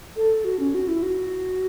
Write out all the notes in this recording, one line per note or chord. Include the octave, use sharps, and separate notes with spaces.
A4
F#4
C#4
F#4
E4
F#4